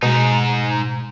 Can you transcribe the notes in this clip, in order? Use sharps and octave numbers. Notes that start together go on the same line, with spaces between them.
G#2 B2 D#4